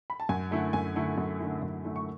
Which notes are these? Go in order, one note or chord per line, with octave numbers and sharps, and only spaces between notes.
B5
A5
F#2 G#5
D3 A3 E4
F#2 G#5
D3 A3 E4
F#2
D3 A3 E4
F#2
D3 A3 E4
C#6